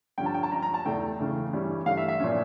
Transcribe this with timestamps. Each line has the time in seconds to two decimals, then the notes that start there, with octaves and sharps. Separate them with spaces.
0.18 G2 D3 F3 C#4 G5
0.26 A5
0.34 G5
0.43 A5
0.52 G2 F3 C#4 A#5
0.62 A#5
0.74 A5
0.85 E2 E3 A3 G5
1.19 C#3 E3 A3
1.53 G2 E3 G3 C#4
1.86 G2 E3 A3 F5
1.97 E5
2.08 E5
2.20 A#2 F3 C#4